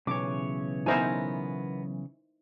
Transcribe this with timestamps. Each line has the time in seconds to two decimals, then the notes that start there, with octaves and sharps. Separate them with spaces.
0.07 B1 C#3 E3 C#5 D6
0.86 B3 D#4 E4 A#4 C5 G#5